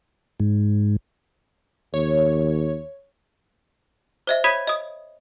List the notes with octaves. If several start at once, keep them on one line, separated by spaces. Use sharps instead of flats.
G#2
D#2 C#5
C5 D#5 E5
C#5 B5 D#6 G#6 B6 D#7
D#5 D#6